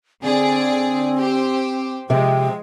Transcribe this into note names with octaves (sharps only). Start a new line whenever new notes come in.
D3 C4 G#4 D5
G4 C5
C3 F3 G#3 C4 G5